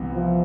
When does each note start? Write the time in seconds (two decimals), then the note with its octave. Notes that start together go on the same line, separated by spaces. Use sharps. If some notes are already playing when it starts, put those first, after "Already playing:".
Already playing: C2 C3 E3 B3
0.14 F3